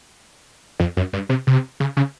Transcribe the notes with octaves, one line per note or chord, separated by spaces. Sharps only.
F2
F#2
G2
C3
C3
C#3
C#3